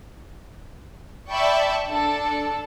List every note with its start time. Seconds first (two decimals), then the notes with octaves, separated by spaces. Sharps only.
1.31 D5 E5 G5 A5 B5 C#6
1.89 D4 A4